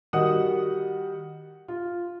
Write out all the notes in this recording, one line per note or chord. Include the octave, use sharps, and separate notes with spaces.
D#3 G3 F#4 D#5 F#5 D#6
F4